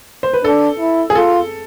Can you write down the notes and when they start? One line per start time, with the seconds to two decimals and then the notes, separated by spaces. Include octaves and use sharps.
0.23 C5
0.33 B4
0.44 D4 A4
0.80 E4
1.10 G#4
1.15 F4 A4